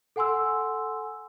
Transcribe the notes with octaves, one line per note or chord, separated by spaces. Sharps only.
A4 F#5 G#5 C6 E6